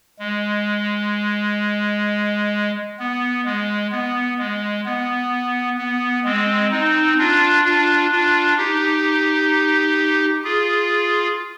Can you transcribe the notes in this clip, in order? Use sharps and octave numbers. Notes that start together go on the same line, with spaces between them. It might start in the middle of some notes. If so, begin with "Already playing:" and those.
G#3
B3
G#3
B3
G#3
B3
B3
G#3 C4
C4 D#4
D4 F4
D4 F4
D4 F4
D#4 G4
F4 G#4